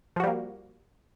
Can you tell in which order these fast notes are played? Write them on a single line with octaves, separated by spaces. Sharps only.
F3 F#4 G3 A#3